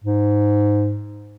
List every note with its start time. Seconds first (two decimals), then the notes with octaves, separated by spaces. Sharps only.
0.04 G#2